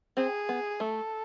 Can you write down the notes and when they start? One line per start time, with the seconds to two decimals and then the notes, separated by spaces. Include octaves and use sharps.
0.17 C4 G#4
0.49 B3
0.80 A3 A4